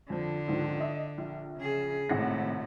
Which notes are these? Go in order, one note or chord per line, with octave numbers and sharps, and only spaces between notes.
F2 D3 F3
C#2 G#2 F3
D#5 E5
A#1
C#3 G#4
G#1 A2 C3 F#5 A#6